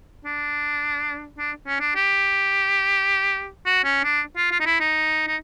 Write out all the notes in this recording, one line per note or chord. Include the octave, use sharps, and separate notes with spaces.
D4
D4
C#4
D4
G4
F#4
C#4
D4
F4
F4
D#4
E4
D#4
D#4